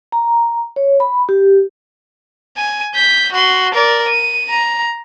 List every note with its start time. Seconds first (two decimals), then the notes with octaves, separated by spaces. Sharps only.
0.12 A#5
0.76 C#5
1.00 B5
1.29 G4
2.57 G#5
2.95 G6 B6
3.32 F#4 C6
3.74 A#4 D5
4.08 D#7
4.50 A#5